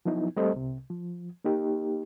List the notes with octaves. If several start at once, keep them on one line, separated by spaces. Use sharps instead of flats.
F3 F#3 B3 D#4 E4
G3 A3 C4 A4 C5 D#5
C2 C3
F3
A#3 D#4 G4